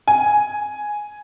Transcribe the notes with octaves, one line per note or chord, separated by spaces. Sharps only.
G#5